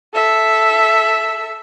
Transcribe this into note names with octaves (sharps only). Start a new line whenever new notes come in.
A4 E5